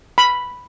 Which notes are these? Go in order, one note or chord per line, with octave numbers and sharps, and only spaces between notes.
B5